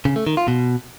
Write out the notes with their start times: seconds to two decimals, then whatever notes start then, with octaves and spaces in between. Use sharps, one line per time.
0.05 C#3
0.16 A3
0.27 D#3
0.37 F4
0.48 B2